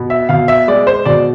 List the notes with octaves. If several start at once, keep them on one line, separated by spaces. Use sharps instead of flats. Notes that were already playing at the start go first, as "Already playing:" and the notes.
Already playing: B2
E5
B2 F5
E5
G#3 D5
C5
B2 D5